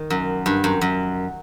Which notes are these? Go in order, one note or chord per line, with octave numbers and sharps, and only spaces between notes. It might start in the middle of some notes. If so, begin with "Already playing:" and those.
Already playing: D#3
F#2
G2
F#2
F#2